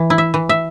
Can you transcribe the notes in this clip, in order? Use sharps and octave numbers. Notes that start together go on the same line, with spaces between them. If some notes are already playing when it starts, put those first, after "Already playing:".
Already playing: E3
E4
E5
E3
E5